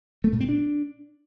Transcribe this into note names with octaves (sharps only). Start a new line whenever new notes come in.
A3
A#2
C4
D4